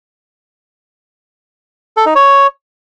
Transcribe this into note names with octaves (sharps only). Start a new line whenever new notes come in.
A4
D#4
C#5